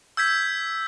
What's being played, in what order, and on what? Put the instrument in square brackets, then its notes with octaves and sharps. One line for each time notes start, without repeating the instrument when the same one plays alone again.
[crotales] E6 G6 G#6 B6